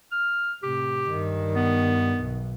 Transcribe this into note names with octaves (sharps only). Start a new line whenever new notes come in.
F6
A2 C3 G4
G2 D#3
B3
B1